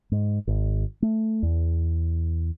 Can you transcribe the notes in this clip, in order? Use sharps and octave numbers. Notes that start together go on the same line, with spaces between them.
G#2
G#1
A3
E2